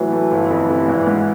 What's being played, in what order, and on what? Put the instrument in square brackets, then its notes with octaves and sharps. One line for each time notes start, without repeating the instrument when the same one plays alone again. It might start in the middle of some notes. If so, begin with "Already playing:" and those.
Already playing: [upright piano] A2 F#3 [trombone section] E3
[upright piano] A3
G1
F2
C3
G#1
G#2